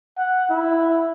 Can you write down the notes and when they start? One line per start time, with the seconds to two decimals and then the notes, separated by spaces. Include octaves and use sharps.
0.17 F#5
0.50 E4